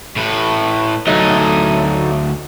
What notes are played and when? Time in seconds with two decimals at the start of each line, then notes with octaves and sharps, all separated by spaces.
0.16 A2 B4
1.07 D2 F#3 A3 D#4 D#5